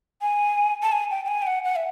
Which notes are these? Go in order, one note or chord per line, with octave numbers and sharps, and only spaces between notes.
G#5
A5
G#5
G5
G5
G#5
G5
F#5
F#5
E5